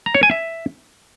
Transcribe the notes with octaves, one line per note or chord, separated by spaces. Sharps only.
A#5
C#5
G#5
E5